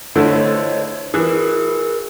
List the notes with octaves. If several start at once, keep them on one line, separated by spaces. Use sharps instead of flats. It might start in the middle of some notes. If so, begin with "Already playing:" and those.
D3 A3 E4 C5 C#5 D#5
E3 G#4 A#4